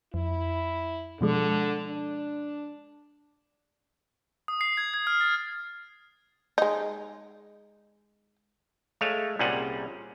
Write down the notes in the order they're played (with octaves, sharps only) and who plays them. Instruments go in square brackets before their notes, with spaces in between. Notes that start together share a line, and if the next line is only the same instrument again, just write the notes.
[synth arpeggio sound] F2 [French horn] E4
[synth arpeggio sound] B2 F3 G#3 [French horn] D3
[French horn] D4
[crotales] D#6
C7
G#6
G#6
F6
A6
[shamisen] G#3 D#4
[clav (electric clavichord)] G#3 A3 C#5 F5
C2 A#2 G3 C#4 G#4 F#5